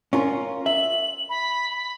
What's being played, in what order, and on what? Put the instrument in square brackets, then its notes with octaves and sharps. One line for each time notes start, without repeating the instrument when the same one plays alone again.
[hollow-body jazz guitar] C#4 F4 A#4
[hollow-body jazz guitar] E5 [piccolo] F#7
[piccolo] B5
B5